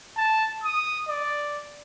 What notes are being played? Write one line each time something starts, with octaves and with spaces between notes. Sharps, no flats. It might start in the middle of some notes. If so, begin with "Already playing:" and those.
A5
D#6
D5